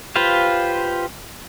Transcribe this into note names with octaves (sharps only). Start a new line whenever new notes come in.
F4 G4 B4 C5 F5